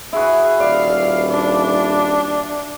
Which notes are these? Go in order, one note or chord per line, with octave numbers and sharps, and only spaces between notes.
E4 F#4 G#4
D#1 D5 F5
D4